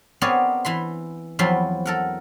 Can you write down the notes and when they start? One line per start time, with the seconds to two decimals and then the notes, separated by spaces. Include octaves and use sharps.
0.21 B3 C4 G#4 A#4 C#5 D5
0.65 E3 B5 C6
1.39 E2 F3 F#3 C4 B5 C6
1.86 A4 A#4 F#5